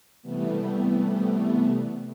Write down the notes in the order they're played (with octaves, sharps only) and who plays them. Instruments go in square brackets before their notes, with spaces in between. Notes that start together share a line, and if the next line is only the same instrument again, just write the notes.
[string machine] C3 E3 G3 A3 B3